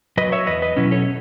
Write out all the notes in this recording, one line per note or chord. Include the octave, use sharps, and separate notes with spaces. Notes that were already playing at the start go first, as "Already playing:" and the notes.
F#3 B4 D#5
C#5 E5
E2 B4 D#5
B4 D#5
B2 F#3 C#4 E4
A4 C#5